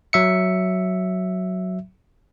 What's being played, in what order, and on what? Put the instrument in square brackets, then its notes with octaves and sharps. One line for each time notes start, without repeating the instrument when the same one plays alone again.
[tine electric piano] F#3 E5 C#7